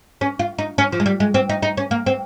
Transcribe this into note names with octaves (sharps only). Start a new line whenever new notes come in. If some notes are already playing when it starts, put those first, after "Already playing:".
C#4
F4
D#4
C#4
F3
G#3
G3
G#3
C4
D#4
D#4
C#4
A#3
C4